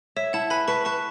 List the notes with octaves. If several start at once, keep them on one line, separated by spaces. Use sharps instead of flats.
C#5 E5
E4 F#5 A5
B4 G#5 B5
B4 A5 C#6
B4 A5 C#6